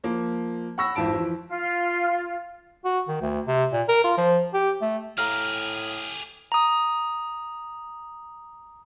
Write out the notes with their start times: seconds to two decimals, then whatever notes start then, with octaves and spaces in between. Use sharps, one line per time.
0.04 F3 A#3
0.78 F#5 B5 C#6 E6 A#6
0.95 G#1 F2 E3 A5 D7
1.12 E3 F3
1.47 F4
2.85 F#4
3.08 D#3
3.21 D2
3.47 C3
3.73 A#2
3.88 A#4
4.04 F4
4.17 F3
4.54 G4
4.82 A3
5.18 A2 G4 G#4 F5 A#5 F6
6.52 A#5 D#6